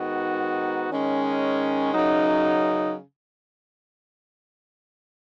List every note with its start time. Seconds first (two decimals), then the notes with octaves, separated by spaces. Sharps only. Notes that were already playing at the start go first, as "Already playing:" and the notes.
Already playing: G#2 D#3 B3 D#4 F#4
0.89 D#3 G#3 C#4
1.93 F#2 C#3 F#3 D#4